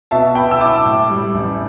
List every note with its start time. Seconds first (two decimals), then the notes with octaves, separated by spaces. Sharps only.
0.11 B2 E5 A5
0.35 B3 G5 B5
0.51 E6
0.60 E4 A5 D6
0.85 A2
1.10 G3
1.34 A1